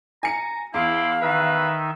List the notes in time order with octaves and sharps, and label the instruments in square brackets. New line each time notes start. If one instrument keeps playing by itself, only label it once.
[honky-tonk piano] G#5 C#7 [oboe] A#5
[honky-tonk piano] E2 [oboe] E4 [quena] F5 [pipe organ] C6 D6
[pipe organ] D#3 D#4 E5 [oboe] B4